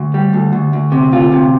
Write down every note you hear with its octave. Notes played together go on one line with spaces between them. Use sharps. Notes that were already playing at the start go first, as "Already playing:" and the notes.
Already playing: D2
G3
D2
D2
D2
C3
D2 F4
C3